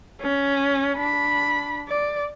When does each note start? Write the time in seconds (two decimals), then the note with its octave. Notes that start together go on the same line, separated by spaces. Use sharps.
0.21 C#4
0.97 D4 B5
1.89 D5